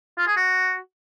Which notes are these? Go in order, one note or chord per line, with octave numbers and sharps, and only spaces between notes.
F4
G#4
F#4